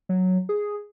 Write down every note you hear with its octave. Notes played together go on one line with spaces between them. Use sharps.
F#3
G#4